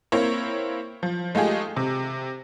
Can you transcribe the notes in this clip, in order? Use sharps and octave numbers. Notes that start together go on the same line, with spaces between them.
A#3 C4 E4 C#5
F3
G#3 A3 D#4 F4 G4 G#4
C3